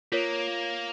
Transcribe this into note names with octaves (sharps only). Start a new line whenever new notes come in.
A#3 F4 A#4 C#5